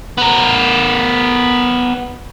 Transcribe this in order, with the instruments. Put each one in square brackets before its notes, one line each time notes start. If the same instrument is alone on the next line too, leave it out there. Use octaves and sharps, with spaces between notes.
[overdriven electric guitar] B3 A#4